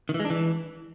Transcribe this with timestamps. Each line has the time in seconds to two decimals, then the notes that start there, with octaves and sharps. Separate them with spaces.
0.09 D#3
0.14 E3
0.20 G#3
0.25 D4
0.30 E3